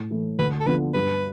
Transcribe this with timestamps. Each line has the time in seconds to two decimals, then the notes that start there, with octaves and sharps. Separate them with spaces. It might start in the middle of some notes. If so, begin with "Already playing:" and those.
Already playing: A2
0.11 E3 A3 E4
0.39 D2 B4
0.60 A4
0.66 D3 F3 B3 B4
0.94 G2 B4